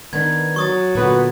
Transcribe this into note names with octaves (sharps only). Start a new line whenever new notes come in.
D#3 B3 D4 G#6
F#3 C#6 D#6 A6
A#2 D3 B3 F#4 B4